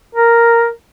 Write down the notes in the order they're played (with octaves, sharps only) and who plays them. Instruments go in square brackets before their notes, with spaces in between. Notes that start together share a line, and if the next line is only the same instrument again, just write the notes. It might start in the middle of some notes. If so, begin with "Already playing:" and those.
[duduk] A#4